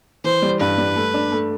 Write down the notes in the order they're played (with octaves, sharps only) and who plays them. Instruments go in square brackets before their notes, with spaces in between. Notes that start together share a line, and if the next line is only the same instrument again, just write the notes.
[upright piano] E3 [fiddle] C5
[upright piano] G3
[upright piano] G2 [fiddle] B4
[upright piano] G3
A3
D4
A3